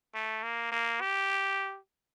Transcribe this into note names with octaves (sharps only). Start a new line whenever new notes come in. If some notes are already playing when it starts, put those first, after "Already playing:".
A3
A#3
A#3
G4